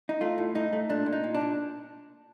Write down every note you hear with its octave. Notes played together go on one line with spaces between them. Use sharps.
D#4
A3 F4
A2
A2 D#4
A3
A#2 D4
A#2
D#4
A#2
D4
A#2